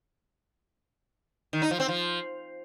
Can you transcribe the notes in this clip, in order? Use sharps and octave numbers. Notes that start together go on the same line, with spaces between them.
D#3
D#4
F3
C4
F3